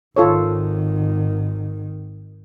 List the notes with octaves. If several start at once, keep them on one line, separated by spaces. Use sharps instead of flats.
G#1 D#3 F4 A4 C#5